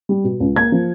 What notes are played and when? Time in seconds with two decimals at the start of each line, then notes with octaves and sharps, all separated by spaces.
0.09 G3
0.24 B2
0.40 C#2
0.56 A#3 G#6
0.72 F3